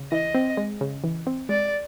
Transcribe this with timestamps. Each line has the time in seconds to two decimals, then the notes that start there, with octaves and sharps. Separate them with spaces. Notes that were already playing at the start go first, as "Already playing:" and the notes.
Already playing: C#3
0.12 E3 D#5
0.35 C4
0.57 G#3
0.81 C#3
1.04 E3
1.27 C4
1.49 G#3 D5